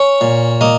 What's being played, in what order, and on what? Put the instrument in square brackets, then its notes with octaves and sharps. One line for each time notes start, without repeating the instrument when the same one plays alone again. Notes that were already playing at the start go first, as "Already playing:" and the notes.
Already playing: [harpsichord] C#4 C#5
A#2
A#3 D#5